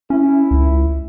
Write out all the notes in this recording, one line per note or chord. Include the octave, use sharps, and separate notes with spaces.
C#4 E4
C#2